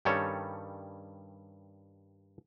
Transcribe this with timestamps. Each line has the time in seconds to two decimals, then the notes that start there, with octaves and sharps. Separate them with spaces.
0.05 G2 D#3 G3 C#4 A4 C#5